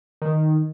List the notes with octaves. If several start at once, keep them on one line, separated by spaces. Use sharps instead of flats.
D#3